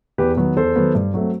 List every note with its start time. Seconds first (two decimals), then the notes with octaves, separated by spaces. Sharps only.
0.18 E2 G4 B4
0.37 D#3 F#3 B3
0.56 E2 A4 C5
0.76 D#3 F#3 B3
0.95 G2
1.14 F#3 A3 C4